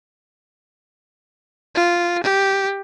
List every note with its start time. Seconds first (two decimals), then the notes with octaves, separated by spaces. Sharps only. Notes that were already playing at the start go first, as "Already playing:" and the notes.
1.75 F4
2.23 G4